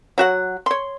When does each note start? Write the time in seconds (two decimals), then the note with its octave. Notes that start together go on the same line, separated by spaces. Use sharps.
0.18 F#3 F#4 F#5
0.66 C#5 C6